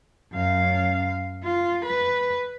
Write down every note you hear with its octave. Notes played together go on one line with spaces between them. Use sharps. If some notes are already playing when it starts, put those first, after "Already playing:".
F#2 F5
F4
B4